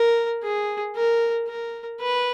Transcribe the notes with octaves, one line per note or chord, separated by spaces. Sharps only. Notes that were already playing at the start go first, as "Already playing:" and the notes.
Already playing: A#4
G#4
A#4
A#4
B4